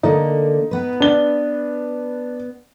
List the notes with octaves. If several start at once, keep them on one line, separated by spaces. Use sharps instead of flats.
D3 A#3 D#4
B3 B4
D4 G7